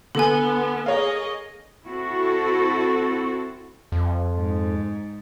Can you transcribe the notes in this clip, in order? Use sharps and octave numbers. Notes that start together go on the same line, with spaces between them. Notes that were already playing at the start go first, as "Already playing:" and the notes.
D3 B3 A4 G#5
G#4 A#4 C#5 D#5 F5
C4 E4 F#4 A4
F2
G#2